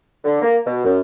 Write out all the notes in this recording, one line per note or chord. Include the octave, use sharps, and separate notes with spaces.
D3
A#3
B2
F#2